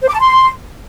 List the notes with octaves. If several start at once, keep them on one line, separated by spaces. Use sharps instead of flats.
C5
D6
A5
C6